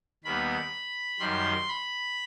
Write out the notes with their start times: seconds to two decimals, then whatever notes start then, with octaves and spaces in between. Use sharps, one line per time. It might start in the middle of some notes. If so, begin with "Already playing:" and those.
0.24 D#2 D#3 G3 B3 B5
1.19 F#2 D#3 G3 C6
1.68 B5